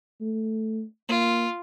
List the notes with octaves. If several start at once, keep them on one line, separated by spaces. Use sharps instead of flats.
A3
A#3 F4